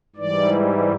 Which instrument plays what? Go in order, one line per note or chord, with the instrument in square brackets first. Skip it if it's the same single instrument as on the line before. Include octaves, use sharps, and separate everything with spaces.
[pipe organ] G#2 E3 G3 D5